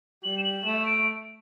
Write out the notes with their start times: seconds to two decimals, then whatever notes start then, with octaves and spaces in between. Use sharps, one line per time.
0.24 G3 F#7
0.38 E7
0.44 F#7
0.65 A3 E7
0.86 D7